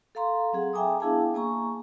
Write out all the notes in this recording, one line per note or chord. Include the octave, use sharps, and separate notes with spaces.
A4 F5 A#5 C6
F#3 C4 G#4 F#5
E5 G5 G#5 A#5 D6 D#6
B3 D4 E4 G#4 F5 A5
A#3 G#5 A#5 C#6